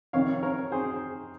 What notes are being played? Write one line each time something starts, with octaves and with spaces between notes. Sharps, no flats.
F2 C3 D#3 C#5 F5
A#4 C#5
G#4 C5